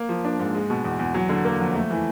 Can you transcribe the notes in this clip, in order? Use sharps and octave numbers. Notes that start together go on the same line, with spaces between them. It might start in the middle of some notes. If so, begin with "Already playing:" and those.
Already playing: A#3
F3
D4
G#2
G#3
B2
E2
E2
F#3
D3
A#3
F2
A3
E3